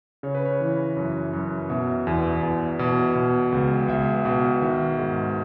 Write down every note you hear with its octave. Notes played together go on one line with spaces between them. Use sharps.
C#3 C#5
B4
C#5
E3
F#2
F#2
B2 E5
E2
E2
B2
B2
C#2
C#2 E5
B2
D#3 E5
G#2